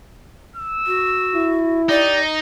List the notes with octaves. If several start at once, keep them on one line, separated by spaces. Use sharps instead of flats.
E6
F#4
E4
D#4 G4 D5